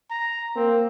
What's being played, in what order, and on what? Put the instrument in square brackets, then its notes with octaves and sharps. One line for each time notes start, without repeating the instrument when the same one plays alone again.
[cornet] A#5
[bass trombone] A#3 [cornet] C4